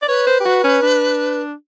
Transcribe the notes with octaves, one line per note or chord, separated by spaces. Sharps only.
D5
B4 C#5
C5
G4
F#4
C#4
D4